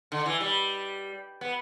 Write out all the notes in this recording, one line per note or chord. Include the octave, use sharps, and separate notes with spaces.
D3
E3
G3
B3